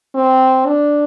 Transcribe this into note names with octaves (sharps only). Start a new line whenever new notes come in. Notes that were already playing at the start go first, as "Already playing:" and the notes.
C4
D4